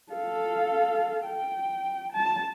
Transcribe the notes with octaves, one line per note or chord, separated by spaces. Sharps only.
A4 F5
G5
A5